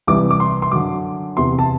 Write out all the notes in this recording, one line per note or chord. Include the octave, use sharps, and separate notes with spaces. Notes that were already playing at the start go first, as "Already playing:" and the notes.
C2 C3 E3 D6
D6
C6
C6
F#2 D3 D6
E2 C3 E3 C6
A5